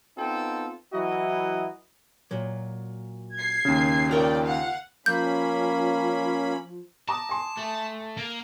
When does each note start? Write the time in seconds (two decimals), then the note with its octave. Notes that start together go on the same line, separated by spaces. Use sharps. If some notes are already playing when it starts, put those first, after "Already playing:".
0.17 B3 C4 D#4 F4 A4 G5
0.92 E3 F#3 E4 F#4 D#5
2.31 A#2 F#3
3.36 G#6 C7
3.65 D#2 C#3
4.11 F4 A#4 C#5 D5 G5
4.45 F5 F#5
5.06 F3 A#3 C#4 B5 G6
7.09 A5 A#5 D6 D#6
7.29 G#5 C6
7.57 A3
8.17 A#3